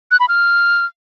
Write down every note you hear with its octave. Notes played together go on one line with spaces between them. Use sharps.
F#6
B5
F6